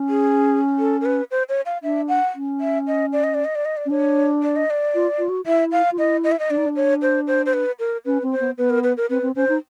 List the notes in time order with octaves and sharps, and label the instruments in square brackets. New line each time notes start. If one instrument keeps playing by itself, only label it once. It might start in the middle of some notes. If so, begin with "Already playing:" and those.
Already playing: [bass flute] C#4
[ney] G#4
A4
A#4
B4
C5
C#5
F5
[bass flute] D4 [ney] E5
[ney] F#5
[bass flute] C#4
[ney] E5
D#5
D5
D#5
D5
D#5
D5
D#5
D5
[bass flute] C#4
[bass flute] D4 [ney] C#5
[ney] D5
D#5
D5
[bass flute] F4
F4
F#4
[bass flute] E4 [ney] E5
[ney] F5
[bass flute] F4
[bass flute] E4 [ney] D#5
[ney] D#5
E5
D#5
[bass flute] D4 [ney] D5
[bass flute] D#4
D4
[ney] C#5
C5
C5
C5
B4
A#4
[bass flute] C#4 [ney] B4
[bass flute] C4
[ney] C5
[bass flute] B3
[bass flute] B3 [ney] B4
[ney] A#4
B4
A#4
[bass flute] C4 [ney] B4
[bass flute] C4
[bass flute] C#4 [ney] C5
[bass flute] D#4